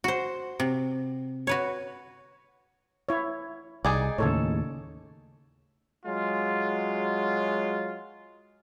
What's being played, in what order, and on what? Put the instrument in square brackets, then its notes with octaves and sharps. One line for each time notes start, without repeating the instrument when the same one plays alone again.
[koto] F#4 C5
C3
F#4 B4 C#5
[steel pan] E4 C#5
[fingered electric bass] C2 [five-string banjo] D#4 G#4 D5
[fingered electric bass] D#2 A2 [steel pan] C#3 A4 C#5
[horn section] F#3 G#3 F4